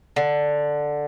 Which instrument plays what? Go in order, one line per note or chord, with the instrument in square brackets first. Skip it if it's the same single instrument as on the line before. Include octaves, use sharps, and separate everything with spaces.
[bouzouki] D3